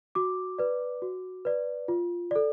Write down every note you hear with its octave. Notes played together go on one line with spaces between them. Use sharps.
F#4 D6
B4 D5
F#4
B4 D5
F4
A4 D5